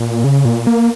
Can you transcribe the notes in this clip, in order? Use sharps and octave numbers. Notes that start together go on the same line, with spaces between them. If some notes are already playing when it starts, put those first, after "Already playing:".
Already playing: A#2
C#3
A#2
A#3